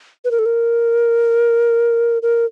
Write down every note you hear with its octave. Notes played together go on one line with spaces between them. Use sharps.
B4
A#4
A4
A#4
A#4